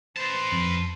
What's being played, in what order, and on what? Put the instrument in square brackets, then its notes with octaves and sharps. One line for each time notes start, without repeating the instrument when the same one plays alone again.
[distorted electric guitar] B4 A5 [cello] C5
[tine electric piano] F2